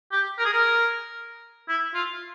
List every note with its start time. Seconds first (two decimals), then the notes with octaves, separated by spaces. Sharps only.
0.12 G4
0.38 A#4
0.45 G#4
0.53 A#4
1.69 E4
1.94 F4